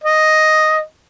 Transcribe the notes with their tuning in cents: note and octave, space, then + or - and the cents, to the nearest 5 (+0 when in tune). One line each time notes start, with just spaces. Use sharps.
D#5 +0